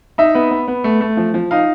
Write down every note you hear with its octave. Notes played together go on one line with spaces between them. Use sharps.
D#4 E5
B3
B3
B3
A3
A3
F3
F3
D#4 F5